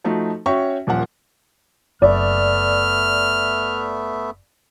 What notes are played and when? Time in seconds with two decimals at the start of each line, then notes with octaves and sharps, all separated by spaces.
0.04 F3 A3 D#4 F#4
0.46 C#4 F#4 C#5 E5 G5 C#6
0.87 D#1 A#2 F3 F#5
2.02 F#1 A3 B3 D5 E5 F6